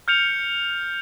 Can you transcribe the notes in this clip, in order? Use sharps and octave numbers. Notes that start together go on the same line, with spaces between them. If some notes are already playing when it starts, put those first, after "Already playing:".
F6 G6 C#7 F7